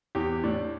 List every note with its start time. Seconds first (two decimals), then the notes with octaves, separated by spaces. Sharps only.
0.15 E2 G4
0.44 A2 D4